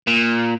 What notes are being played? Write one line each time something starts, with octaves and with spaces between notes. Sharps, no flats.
A#2